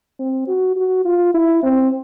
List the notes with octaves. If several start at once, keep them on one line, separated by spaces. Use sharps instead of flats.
C4
F#4
F#4
F4
E4
C4